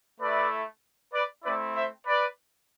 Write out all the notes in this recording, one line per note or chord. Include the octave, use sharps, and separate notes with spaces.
A3 E4 B4 D5
B4 D5
A3 C4 E4 B4 D5
C5 E5
B4 D5